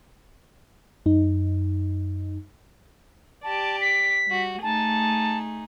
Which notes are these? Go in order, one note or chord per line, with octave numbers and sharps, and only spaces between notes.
F#2 D#4
G4 D5 A5
B6
G3 F#4
A3 D#4 G#4 A5